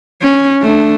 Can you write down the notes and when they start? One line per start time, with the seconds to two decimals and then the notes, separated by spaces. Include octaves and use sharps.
0.22 C#4
0.62 A3 D4